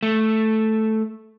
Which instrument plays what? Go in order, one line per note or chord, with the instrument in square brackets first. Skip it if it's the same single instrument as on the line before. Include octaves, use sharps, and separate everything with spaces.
[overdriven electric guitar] A3